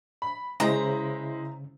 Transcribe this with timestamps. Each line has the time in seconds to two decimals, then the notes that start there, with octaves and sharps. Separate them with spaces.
0.22 B5
0.60 C#3 G#3 E4 C5 A#5